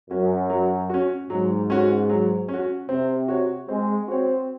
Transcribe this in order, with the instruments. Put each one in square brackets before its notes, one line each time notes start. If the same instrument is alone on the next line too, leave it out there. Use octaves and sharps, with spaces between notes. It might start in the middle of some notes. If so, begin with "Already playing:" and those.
[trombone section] F#2 [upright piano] C#4 F#4
[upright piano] F#3
C#4 F#4
[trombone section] G#2 [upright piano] F#3
[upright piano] C#4 F#4
F#3
C#4
F#4
[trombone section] C3 [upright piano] C4
[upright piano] F#4 C#5
[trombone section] G#3 [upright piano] C4
[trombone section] C4 [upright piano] F#4 C#5